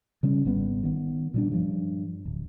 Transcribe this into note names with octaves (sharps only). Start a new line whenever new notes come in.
C#3 G3 C#4
G#1 G3 B3
D#3 B3
A#2 G3 D4
G2 F3
D1